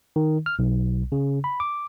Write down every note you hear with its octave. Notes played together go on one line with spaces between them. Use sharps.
D#3
F6
B1
C#3
B5
D6